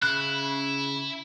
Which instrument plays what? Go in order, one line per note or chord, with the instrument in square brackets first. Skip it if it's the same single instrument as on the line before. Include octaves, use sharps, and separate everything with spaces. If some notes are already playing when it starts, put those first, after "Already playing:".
[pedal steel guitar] C#3 F#6 [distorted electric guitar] E4